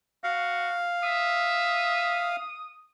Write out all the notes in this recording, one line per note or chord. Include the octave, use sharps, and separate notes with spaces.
F#4 F5
E5 D#6